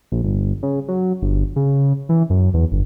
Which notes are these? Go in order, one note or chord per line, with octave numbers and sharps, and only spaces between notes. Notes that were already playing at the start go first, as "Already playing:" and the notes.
A#1
G1
C#3
F#3
G1
C#3
E3
F#2
E2
G1